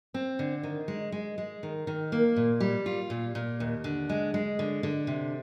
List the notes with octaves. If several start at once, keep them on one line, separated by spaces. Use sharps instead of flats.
C4
D3
D#3
G#3
G#3
G#3
D#3
D#3
A#3
A#2
G3
F4
A#2
A#2
D#2
D3
G#3
G#3
D3
D3
C3